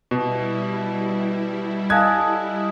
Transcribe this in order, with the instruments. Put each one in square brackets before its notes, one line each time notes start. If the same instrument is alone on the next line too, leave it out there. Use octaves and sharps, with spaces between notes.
[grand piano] B2 [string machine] G3 E4
[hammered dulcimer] A4 D#5 [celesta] F5 G#5 F#6 [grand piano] G#6